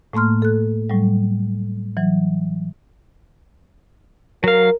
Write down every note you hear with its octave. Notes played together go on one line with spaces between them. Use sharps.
A2 A3 A#3 C6 F6
A4 F#6
A2 F#3 G3
E3 F#3
F#3 A#4 F5